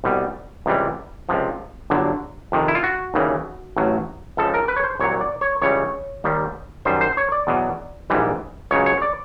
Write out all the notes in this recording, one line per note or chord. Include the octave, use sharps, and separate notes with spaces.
C2 B2 G3
C#2 C3 E3 G3
C#2 C3 F3
G1 G2 D3 F#3
F2 C3 D#3
E4
F4
F#4
D#2 C#3 E3 G3
A1 A2 F#3
C#2 C#3 F3 A4
A#4
B4
C#5
C5
C2 A#2 F#3 C#5
D5
C#5
C#2 C#3 E3 G3 C#5
D#2 D#3 G3
F#2 D#3 G3 C5
C5
C#5
D5
E2 B2 F#3
A#1 G#2 E3 G3
C#2 C#3 F#3 C#5
C#5
D5